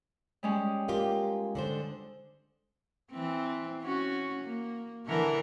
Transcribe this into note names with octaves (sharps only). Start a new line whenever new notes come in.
G3 G#3 C#4
A#3 F4 G4
D3 D4 C5
E3 C4
C#4 F#4
A#3
D3 E3 A#4